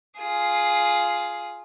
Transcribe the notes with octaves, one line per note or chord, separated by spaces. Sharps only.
F4 G#4